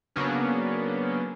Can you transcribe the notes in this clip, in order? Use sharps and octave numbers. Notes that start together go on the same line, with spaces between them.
C#3 F#3 A#3 B3 C#4 D4